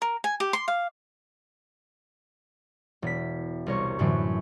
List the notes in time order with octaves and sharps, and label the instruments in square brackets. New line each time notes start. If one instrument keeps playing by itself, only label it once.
[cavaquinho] A#4
G#5
G4
C6
F5
[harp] E1 B6
C2 A#4 C#5
F#2 A2 D3 E3 F#3